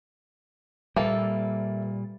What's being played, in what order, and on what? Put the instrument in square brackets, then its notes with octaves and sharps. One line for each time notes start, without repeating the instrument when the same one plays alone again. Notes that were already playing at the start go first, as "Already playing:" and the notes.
[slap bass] A#2 G3 [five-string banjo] A#3 A4 [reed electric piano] B4 E5